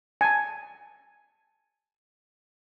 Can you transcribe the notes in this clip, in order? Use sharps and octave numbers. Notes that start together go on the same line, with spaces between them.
G#5 A5